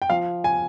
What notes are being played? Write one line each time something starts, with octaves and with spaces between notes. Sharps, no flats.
G5
F3 F5
G#5